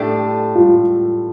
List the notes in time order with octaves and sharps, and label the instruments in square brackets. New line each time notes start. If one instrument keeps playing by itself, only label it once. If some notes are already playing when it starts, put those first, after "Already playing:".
Already playing: [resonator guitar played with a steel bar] A2 A3 D4 G4 [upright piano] A4
[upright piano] F4